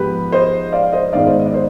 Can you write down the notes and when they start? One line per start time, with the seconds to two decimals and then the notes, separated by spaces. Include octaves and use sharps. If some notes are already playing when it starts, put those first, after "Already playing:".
Already playing: G#2 F3 B3 G4 B4
0.32 C5 D#5
0.72 D5 F5
0.93 C5 D#5
1.13 G#2 D#3 B3 D5 F5
1.26 C5 D#5
1.39 D#5
1.46 D5
1.54 C5